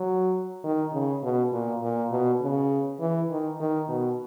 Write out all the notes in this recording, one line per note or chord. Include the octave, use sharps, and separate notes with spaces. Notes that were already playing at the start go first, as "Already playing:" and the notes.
Already playing: F#3
D#3
C#3
B2
A#2
A#2
B2
C#3
E3
D#3
D#3
B2